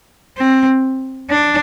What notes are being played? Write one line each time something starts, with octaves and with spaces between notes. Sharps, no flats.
C4
D4